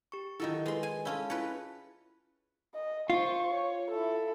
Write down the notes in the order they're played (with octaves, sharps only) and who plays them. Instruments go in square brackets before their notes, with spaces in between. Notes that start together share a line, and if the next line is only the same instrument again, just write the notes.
[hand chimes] G4 C#6
[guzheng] D#3 F#3 A4 [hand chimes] E4 F4 D#5
[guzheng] G#3 C6 [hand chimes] A4 B4
[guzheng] G#5
[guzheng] G#3 C#4 E4 [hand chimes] C#5 F5 A5
[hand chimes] C#4 E4 F4 [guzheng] B4 C#5
[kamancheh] D#5
[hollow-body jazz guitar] F4 [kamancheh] C5 C#6
[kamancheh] C#5
E4 A4